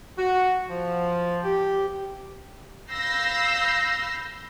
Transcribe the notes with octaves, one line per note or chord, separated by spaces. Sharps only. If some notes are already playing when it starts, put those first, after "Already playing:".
F#4
F3
G4
F5 B5 E6 G6 A#6 C7